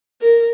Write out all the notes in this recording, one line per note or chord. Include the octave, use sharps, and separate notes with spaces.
A#4